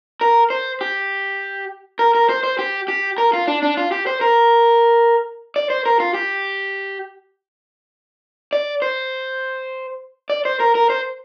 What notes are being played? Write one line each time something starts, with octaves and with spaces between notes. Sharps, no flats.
A#4
C5
G4
A#4
A#4
C5
C5
G4
G4
A#4
F4
D4
D4
F4
G4
C5
A#4
D5
C5
A#4
F4
G4
D5
C5
D5
C5
A#4
A#4
C5